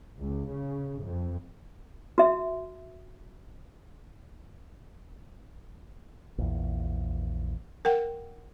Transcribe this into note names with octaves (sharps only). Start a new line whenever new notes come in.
C#2
C#3
F2
F#4 E5
A#1 E2
A#4 F#5 G5